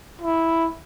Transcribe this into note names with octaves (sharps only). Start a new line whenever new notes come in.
E4